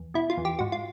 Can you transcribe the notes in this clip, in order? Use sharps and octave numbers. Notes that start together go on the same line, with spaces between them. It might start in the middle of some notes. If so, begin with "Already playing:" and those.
Already playing: E2
B2 E4
F4
E2
G4
G#2 F#4
F4